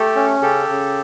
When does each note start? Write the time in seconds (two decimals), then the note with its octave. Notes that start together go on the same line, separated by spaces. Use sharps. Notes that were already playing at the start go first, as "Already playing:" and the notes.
Already playing: A3 G4 A4
0.16 C#4
0.42 C#3 G4 A4
0.69 C#3